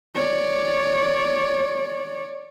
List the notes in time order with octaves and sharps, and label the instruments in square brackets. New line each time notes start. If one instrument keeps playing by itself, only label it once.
[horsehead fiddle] C#5 D5